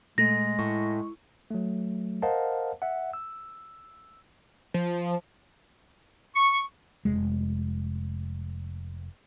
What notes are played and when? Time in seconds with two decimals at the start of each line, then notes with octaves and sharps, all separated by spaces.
0.18 A#2 G#3 A3 A#6
0.59 A2 C#6
1.51 F#3 A3
2.22 A#4 C5 D#5 F5 F#5 A5
2.82 E5 F#5
3.13 E6
4.74 F3
6.35 C#6
7.05 F1 G#3